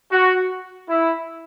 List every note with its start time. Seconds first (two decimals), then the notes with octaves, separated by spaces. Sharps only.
0.10 F#4
0.88 E4